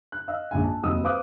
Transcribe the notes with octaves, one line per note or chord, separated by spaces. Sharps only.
F#6
D#5 F5 E6
A#1 G#2 G#5
A5
F1 D#2 F#3 D#5 D#6 E6
B4 C5 F5 D6 D#6 F#6